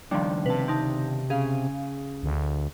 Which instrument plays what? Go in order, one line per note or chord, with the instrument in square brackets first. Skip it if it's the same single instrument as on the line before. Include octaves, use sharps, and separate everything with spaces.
[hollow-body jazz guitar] C#2 D#3 D4 [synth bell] F3 G3
[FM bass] C3 [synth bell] B4 A5
[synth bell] C4 D#4 A5
[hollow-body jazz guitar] C#3 [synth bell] G#4 F5
[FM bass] D2